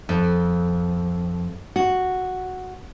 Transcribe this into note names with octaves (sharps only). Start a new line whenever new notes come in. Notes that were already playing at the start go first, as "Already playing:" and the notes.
F2
F#4